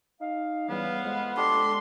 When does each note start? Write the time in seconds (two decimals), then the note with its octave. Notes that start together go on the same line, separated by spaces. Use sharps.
0.21 D#4 F5
0.69 C#3 E3 G3 B3 F5
1.04 F2 G#3
1.37 D4 G4 A4 C6